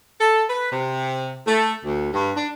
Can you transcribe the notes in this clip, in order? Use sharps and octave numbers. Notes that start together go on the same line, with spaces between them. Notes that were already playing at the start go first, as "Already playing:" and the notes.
A4
B4
C3
A3
D2
G2
D4